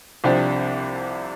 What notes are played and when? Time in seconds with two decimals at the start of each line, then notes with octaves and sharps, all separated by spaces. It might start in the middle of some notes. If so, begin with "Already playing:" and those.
0.24 C2 C3 F3 D4 G4